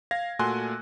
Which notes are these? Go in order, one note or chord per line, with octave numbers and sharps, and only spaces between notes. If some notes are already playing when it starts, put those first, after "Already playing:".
F5 G#6 A#6
A#2 A3 F#4 G#5 C6 F#6